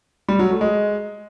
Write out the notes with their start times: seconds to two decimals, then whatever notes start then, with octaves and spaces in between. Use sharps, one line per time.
0.28 G3
0.39 F#3
0.50 A3
0.61 G#3